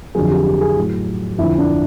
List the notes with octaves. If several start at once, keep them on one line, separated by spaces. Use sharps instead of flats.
F2 D3 F#3 G#4
G4
G4
G#4
A2 F#3
F2 D3 F3 E4
D4